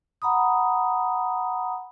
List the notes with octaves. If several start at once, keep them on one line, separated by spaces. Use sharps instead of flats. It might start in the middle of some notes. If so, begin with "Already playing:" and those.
F#5 A#5 B5 D#6